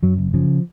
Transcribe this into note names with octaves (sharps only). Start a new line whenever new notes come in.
F#2 F#3
F#1
C#3 F3